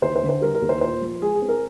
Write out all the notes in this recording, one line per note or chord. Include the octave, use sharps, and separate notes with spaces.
D#2 C5
C5
D3
C5
G3 A#4
A#4
D#2
C5
A#2 C5
F3
G#3 G#4
G#4
C4
A#4